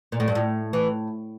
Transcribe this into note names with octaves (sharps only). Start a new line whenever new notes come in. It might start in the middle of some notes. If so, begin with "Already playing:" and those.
A#2
A2
G2
A2
E3